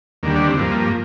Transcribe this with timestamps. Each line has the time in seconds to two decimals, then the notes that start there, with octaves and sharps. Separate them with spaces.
0.23 D#2 D3 G3 A#3
0.35 D4
0.47 C4
0.59 G2 F3 A#3